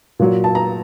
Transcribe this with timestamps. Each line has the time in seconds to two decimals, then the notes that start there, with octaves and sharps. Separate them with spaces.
0.19 A#2 F#3
0.44 A5
0.55 A#5